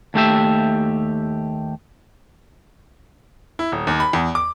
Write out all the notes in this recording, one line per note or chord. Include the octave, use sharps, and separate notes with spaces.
D#2 A3 G4 E5
E4
D#1
D#2
B5
E2
D6